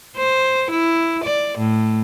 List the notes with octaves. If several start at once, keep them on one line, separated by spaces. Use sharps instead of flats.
C5
E4
D5
A2